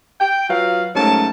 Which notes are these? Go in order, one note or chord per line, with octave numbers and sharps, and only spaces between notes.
G5
F#3 F4 B4 F5
G#2 F#3 A3 C#4 A#4 A5